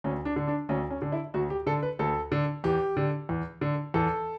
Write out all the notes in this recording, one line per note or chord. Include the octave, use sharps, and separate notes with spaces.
D2 C#4
D4
D3
D4
D2 C#4
C#4
D3
E4
D2 F#4
G4
D3 A4
B4
D2 A4
D3
E2 G4
D3
E2
D3
E2 A4